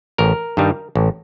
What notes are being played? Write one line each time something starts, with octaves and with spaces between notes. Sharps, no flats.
A1 A#4
G2 D#3 G3
A1